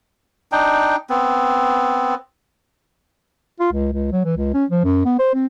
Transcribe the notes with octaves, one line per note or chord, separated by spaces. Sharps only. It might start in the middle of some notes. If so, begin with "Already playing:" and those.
D4 D#4 G5
B3 C4
F4
C#2
C#2
F#3
E3
C#2
C#4
F3
F#2
B3
C5
C4